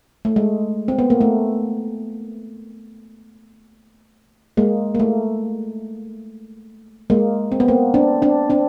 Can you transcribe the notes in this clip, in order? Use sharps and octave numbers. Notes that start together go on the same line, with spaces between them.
A3
G#3
C4
B3
A#3
A3
G#3 A#3
A#3
A3
G#3 A#3
C4
B3
A#3 C4
C4 D4
C4 D4
C4 D4